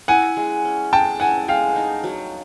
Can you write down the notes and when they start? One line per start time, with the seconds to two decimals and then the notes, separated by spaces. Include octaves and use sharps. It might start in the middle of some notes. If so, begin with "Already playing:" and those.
0.08 E4 F#5 G#5
0.37 G#3
0.65 C#4
0.93 G#3 G5 A5
1.20 E4 F#5 G#5
1.48 G#3 F5 G5
1.76 D#4
2.04 F#3